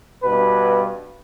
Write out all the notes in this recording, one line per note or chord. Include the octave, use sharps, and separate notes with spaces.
G2 B2 B4